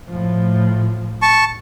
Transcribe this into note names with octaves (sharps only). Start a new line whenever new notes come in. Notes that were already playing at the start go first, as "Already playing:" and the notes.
A2 F3
A5 C#6